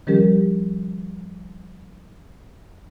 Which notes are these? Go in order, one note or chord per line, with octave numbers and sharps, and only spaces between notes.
D#3 F3 G3 C#4 G4 A#4